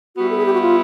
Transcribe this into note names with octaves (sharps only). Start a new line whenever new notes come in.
G3 B3 E4 F#4
A4
G#4
G4
F#4
F4